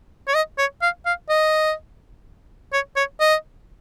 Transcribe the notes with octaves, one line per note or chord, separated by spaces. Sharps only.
C#5
D#5
C#5
F5
F5
D#5
C#5
C#5
D#5